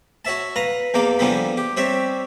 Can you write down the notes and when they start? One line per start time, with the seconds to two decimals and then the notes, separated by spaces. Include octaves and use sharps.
0.25 F#4 C#5 E5 A5
0.56 B4 F5 A#5
0.94 E2 E3 A#3 D6
1.19 D3 E3 F3 G3 A#3 B3
1.57 G4
1.77 G3 C4 G4 C#5 E5